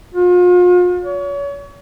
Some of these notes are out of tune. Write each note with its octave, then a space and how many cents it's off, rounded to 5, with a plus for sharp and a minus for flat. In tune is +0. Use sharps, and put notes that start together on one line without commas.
F4 +40
C#5 +35